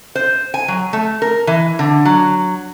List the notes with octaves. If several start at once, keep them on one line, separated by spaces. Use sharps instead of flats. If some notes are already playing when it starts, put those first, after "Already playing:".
C5
G#5
F#3
A3
A#4
E3
D3
F#3